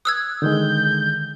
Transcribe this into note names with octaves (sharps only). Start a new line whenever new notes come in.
D#6 E6 F#6 G#6
D3 D#3 G#3 G6